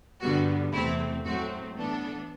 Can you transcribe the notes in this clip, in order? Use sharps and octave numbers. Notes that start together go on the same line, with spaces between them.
G2 D3 G3 B3 F#4
E2 C3 E3 A3 C4 E4
A2 F#3 A3 C4 F#4
A2 E3 B3 D4 A4